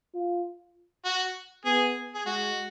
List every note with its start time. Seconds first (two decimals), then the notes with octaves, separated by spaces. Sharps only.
0.14 F4
1.05 F#4
1.65 B3 G#4
2.15 G#4
2.25 G#3 F#4